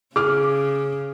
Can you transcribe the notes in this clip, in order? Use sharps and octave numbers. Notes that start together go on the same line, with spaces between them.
C#3 G#4 D6 F6